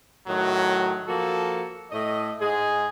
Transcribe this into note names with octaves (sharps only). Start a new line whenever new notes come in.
A2 D#3 F#3
F3 A#3 F#4 A4
A2 D#5
G#2 G#3 G#4